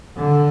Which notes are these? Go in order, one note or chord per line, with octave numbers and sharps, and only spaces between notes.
D3